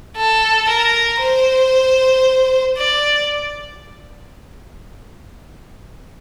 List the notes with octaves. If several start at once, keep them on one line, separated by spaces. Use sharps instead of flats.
A4
A#4
C5
D5